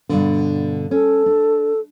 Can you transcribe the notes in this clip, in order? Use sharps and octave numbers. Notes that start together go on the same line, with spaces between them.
G2 B2 D3
C#4 A4
D4